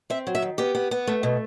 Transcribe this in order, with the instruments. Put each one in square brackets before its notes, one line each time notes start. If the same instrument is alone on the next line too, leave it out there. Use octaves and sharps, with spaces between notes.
[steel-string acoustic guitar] C4 E5
F#3
E5
D#3
B3 G4
B3
B3
A3
B2